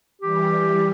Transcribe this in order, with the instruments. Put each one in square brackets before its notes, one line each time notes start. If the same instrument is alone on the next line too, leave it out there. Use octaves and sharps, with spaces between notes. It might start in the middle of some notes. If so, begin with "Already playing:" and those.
[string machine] E3 G3 [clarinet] G4